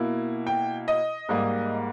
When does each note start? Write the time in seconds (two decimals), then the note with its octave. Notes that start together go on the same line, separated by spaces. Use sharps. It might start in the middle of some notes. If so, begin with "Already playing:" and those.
Already playing: B2 A#3 E4
0.47 G5
0.88 D#5
1.29 G#2 G3 A#3